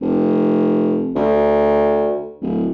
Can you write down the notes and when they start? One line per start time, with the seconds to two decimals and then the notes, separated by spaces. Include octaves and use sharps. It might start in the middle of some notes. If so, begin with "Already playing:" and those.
0.01 F1
1.15 D2
2.42 D1